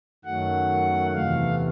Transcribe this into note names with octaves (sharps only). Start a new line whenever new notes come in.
F#2 D#3 F#3 A3 F#5
E2 C3 E3 A3 F5